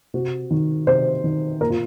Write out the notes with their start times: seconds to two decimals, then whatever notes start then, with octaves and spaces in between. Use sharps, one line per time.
0.14 C3 F#4
0.51 D#3
0.87 C3 C5
1.24 D#3
1.61 A#2 A#4
1.70 F4